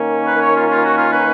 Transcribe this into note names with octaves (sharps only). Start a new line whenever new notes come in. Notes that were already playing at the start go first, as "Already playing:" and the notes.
Already playing: D#3 A#3 C#4
B4
C#5
F4
F4
F#4
F4
B4